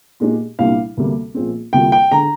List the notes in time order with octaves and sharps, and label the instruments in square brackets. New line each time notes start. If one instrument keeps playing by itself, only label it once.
[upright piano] A#2 G#3 D#4 G4
[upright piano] C2 A#2 G3 D4 [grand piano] F5
[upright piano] D2 C3 G3 A#3
A#1 A#2 G#3 C4
[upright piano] D2 C3 G3 A#3 F4 [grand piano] G5
[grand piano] G5
[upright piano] D3 G#3 [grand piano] A#5